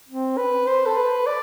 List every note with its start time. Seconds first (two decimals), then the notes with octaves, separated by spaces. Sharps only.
0.09 C4
0.37 B4
0.66 C5
0.86 A4
0.96 B4
1.26 D5